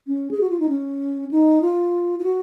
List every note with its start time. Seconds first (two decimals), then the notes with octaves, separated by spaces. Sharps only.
0.07 C#4
0.31 G#4
0.41 F#4
0.50 F4
0.60 D#4
0.69 C#4
1.31 D#4
1.62 F4
2.19 F4
2.24 F#4